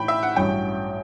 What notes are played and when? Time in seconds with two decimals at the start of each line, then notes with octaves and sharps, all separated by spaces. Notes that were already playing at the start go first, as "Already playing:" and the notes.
Already playing: A2 E3 G5 B5
0.08 E5
0.23 F#5
0.36 A1 G2 F#3 C#4 G5